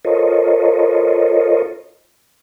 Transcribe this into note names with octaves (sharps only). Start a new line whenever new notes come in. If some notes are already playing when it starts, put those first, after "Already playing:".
F4 A4 A#4 C5 C#5 D#5